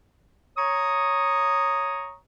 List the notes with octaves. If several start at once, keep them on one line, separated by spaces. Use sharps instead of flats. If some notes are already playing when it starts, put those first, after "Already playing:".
C#5 A#5 C#6 D#6